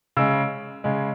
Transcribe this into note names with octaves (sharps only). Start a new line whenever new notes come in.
C#3 G#3 E6
C#3 G#3